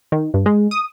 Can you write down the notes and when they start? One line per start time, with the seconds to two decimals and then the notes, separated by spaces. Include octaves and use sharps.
0.12 D#3
0.34 G2
0.46 G#3
0.71 D#6